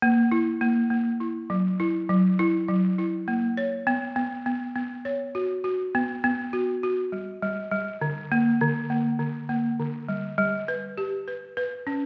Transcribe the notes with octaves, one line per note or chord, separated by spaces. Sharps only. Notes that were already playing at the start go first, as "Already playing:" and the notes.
A#3
E4
A#3
A#3
E4
F#3
E4
F#3
E4
F#3
E4
A#3
C#5
B3
B3
B3
B3
C#5
F#4
F#4
B3
B3
F#4
F#4
G3
G3
G3
D3
A#3
D3
A#3
D3
A#3
D3
G3
G3
B4
G4
B4
B4
C#4